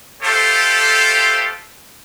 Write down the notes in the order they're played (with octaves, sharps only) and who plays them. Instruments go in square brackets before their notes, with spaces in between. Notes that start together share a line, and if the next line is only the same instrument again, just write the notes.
[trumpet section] A3 F4 G4 A4 C5